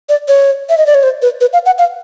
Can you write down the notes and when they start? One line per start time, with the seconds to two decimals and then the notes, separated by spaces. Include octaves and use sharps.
0.09 D5
0.28 C#5
0.69 E5
0.78 D#5
0.86 D5
0.95 C#5
1.03 C5
1.22 B4
1.41 B4
1.53 F5
1.66 F#5
1.78 F5